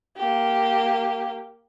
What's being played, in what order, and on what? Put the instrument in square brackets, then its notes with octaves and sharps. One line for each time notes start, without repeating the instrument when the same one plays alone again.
[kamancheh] A#3 G4